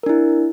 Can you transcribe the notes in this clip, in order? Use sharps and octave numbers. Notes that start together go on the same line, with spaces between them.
D4 E4 A#4